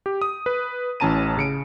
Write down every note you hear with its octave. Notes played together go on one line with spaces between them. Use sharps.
G4
D#6
B4
A1 E3 C#4 A5 A#5 D#7
C#3 C#7 D7